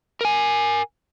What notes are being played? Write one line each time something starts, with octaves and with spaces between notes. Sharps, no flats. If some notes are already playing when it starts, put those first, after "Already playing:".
A#4 G#5